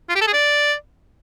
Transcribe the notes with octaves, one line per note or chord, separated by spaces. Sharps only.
F4
G4
A4
G#4
D5